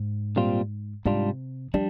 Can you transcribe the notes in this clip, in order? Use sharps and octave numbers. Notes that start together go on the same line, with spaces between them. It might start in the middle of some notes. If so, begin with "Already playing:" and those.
Already playing: G#2
A#2 G3 C4 F4
G#2 C3 G3 D4 F4
F3 G3 D4